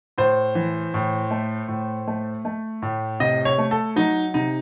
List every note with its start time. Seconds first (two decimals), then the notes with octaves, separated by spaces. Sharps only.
0.18 A2 C5
0.55 E3
0.94 A2
1.31 A3
1.68 A2
2.07 A3
2.45 A3
2.82 A2
3.20 C3 D#5
3.45 C#5
3.58 A3
3.71 A4
3.96 F#3 D#4
4.34 C3 D#4